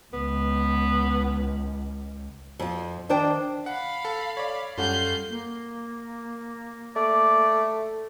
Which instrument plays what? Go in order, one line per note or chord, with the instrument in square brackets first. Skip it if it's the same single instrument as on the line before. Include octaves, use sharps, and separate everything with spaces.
[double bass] C#2 [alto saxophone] B3
[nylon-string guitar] F2 F4
[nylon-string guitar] D#3 C5 G5 [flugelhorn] D4
[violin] F5 B5 [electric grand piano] F#5
[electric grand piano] A4
C#5 D5
[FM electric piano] F#2 A4 F#5 [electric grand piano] G3 C#4 F4 [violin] G6 C7
[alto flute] A#3
[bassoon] A3 [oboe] D5